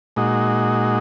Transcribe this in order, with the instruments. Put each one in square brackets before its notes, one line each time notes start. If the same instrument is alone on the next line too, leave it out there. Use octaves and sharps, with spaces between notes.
[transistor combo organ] A#2 G#3 D#4 F#4